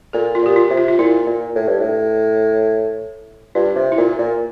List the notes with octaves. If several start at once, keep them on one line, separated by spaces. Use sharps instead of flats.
A#2 A4
F4
A#2 G4
F4
C3
F4
F4
A#2 E4
A#2
A2
G2
A2
G2 F4
C3
E4
A#2 F4
A#2